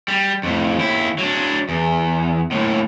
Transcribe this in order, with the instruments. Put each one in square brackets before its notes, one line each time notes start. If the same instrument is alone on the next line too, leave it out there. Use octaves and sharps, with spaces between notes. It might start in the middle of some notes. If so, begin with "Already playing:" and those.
[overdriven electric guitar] G3
F2 A2
D#2 E4
F#3 D4
E2
D#2 A2